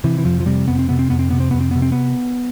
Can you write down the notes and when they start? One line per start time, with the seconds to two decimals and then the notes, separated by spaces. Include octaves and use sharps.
0.04 C3 E3
0.18 E3
0.25 F2 F3
0.40 F3
0.46 C3 G3
0.68 F2 B3
0.79 C4
0.89 C3 B3
0.99 C4
1.10 F2 B3
1.19 C4
1.30 C3 B3
1.40 C4
1.51 F2 B3
1.61 C4
1.71 C3 B3
1.82 C4
1.92 B3